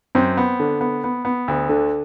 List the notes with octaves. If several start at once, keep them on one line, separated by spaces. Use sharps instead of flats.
F#2 C4
B3
D3
B3
B3
B3
D2
D3